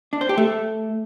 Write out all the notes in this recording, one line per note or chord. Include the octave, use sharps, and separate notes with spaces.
D4
C5
G4
A3